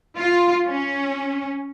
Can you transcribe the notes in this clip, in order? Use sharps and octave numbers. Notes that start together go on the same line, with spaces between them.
F4
C#4